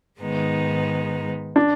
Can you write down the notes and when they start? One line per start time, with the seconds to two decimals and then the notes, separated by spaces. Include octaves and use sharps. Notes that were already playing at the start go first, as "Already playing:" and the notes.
0.19 G#2 D#3 G#3 B3 D#4
1.56 D4